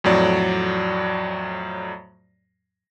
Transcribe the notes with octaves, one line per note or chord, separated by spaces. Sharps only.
F2 A2 F#3 D5